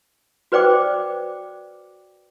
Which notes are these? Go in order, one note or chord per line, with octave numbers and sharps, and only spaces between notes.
F#4 B4 C5 D5 G5 D6